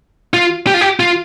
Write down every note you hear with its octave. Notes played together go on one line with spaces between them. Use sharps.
F4
G4
F4
G4
F4